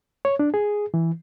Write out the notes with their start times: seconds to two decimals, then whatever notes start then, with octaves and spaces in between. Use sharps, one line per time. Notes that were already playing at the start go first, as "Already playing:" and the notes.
0.25 C#5
0.39 D4
0.54 G#4
0.94 E3